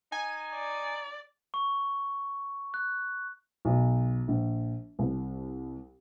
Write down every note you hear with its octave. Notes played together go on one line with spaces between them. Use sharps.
D#4 G#5
D5
C#6
F#6
B1
A#1
C2